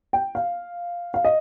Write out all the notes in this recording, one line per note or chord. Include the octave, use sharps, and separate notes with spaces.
G5
F5
F5
D#5